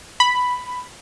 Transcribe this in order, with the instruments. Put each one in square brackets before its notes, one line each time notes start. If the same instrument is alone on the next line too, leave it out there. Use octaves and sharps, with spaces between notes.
[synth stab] B5